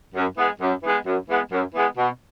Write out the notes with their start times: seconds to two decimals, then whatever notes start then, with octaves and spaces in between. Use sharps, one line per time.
0.15 F#2
0.37 E3 G#3 B3
0.60 F#2
0.83 E3 G#3 B3
1.06 F#2
1.29 E3 G#3 B3
1.52 F#2
1.75 E3 G#3 B3
1.97 B2